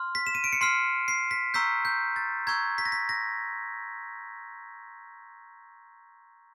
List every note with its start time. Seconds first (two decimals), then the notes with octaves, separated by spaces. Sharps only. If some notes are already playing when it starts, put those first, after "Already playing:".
Already playing: C6 F6
0.15 B6
0.27 E7
0.35 D#7
0.44 D7
0.53 C#7
0.61 C6 F6 C7
1.08 C7
1.31 B6
1.54 A#5 C#6 E6 G6 B6
1.85 G6
2.16 A6
2.47 A#5 C#6 E6 G6 G#6
2.78 B6
2.85 A#6
2.92 B6
3.09 A#6